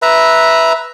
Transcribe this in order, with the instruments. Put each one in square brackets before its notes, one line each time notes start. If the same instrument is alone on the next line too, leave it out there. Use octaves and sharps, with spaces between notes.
[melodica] B4 E5 A#5